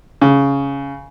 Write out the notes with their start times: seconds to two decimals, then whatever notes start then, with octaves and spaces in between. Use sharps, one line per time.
0.21 C#3